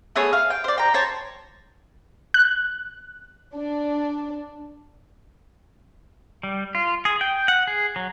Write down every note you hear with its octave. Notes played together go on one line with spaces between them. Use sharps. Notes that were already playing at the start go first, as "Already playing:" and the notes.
A3 B3 G#4 C#5
F5
G5
C5 D5
G5 A#5
C5 C#5 A5
F#6
D4
G3
F4
G#4
G5
F#5
G#4
F#3